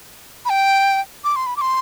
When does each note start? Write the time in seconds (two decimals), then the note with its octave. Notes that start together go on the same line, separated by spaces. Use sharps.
0.45 B5
0.50 G5
1.24 D6
1.36 C6
1.46 B5
1.57 D6
1.61 C6